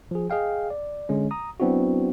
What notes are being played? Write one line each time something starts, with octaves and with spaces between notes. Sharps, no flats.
F3 G#4
G#4 D#5 F5 G5
D5
D3 G#3 C#4
A#5 D#6
F#3 B3 C4 D4 E4 F#4